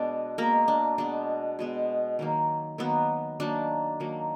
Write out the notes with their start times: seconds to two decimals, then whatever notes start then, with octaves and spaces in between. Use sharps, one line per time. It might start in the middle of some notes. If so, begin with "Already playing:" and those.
Already playing: B2 G#3 B3 D4 D5
0.38 B2 G#3 A#3 B3 A#4
0.68 D4
0.98 B2 G#3 B3 D4
1.59 B2 G#3 B3
2.19 D#3 F#3 A#3
2.78 D#3 F#3 A#3 B3
3.40 D#3 F#3 A#3 D4
4.00 D#3 F#3 A#3